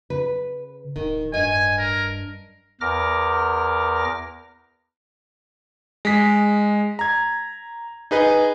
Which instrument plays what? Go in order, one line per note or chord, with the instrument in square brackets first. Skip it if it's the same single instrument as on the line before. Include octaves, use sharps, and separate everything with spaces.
[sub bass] C#3 [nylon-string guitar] B4
[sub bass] D1 [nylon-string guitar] D#3
[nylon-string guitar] G2 D#5 [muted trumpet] G#5
[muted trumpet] A#4
[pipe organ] E2 A#4 D6 F6 A#6
[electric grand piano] G#3 B6
A#5 G#6
D#4 G#4 B4 D#5